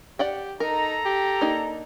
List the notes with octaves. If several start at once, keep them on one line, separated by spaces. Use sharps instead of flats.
G4 D5 F#5 G5
D#4 A4 A#4 A#5
G4
A#3 D4 D#4